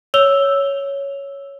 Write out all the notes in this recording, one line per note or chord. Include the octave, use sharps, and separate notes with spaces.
C#5 E6 F7 G7